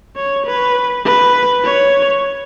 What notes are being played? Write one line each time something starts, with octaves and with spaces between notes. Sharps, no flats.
C#5
B4
B4
C#5